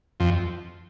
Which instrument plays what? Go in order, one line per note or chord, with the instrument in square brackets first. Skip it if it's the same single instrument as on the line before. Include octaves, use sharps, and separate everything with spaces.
[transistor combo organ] F2